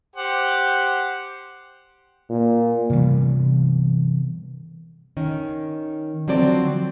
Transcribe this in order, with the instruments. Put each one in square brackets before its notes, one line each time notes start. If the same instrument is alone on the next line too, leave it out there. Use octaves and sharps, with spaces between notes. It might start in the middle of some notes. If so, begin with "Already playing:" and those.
[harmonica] G4 C5 F#5
[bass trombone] A#2
[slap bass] C3 E3 G3 B3
[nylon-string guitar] D#3 C#4
D3 F3 F#3 C4 D5